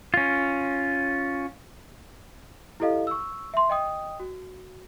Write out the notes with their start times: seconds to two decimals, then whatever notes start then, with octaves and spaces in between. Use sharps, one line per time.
0.14 C#4 F4
2.80 E4 G4 A4 D#5 F5
3.07 C#6 E6
3.54 E5 C6
3.70 D#5 G5 D#6
4.20 F#4